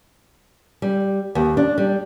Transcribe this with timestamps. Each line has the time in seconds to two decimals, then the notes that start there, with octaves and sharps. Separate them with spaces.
0.82 G3
1.35 D#2
1.57 D4
1.78 G3